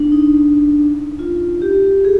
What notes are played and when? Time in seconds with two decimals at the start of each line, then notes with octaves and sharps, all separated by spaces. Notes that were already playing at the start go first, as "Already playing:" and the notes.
Already playing: D4
0.12 D#4
1.19 F4
1.62 G4
2.05 G#4